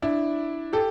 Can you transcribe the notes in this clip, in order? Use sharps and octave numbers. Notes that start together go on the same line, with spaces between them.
D4 E4
G4 A4